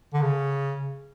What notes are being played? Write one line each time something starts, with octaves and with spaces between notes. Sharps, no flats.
D3
C#3